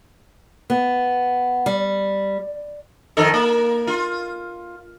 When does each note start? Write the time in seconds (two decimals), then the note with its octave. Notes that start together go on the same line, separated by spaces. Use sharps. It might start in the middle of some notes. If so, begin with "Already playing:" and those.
0.70 B3
1.66 G3
3.17 F2 D#3 A4
3.34 A#3
3.87 F4